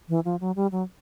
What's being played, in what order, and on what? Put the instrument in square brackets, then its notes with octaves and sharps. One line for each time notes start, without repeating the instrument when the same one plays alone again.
[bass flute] E3
F3
F#3
G3
F#3